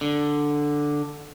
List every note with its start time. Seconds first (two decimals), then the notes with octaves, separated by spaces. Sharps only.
0.01 D3